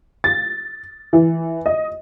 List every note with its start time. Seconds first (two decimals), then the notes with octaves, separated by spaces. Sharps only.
0.24 A6
1.13 E3
1.66 D#5